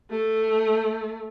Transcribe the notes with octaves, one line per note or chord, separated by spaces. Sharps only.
A3